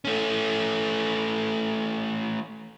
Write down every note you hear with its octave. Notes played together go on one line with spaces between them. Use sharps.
A3 C#4